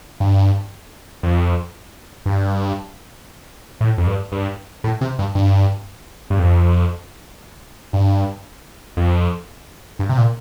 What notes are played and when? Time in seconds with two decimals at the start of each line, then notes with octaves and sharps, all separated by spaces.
0.20 G2
1.23 F2
2.26 G2
3.81 A2
3.98 F2
4.07 G2
4.32 G2
4.84 A2
5.01 C3
5.19 G2
5.35 G2
6.30 G2
6.39 F2
7.93 G2
8.97 F2
9.99 G2
10.09 C3
10.17 A#2